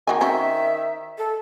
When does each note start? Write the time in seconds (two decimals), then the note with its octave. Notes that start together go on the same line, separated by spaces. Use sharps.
0.07 D#3 A#3 F#4 G#5
0.21 C4 C#4 F#4 E5
1.18 A4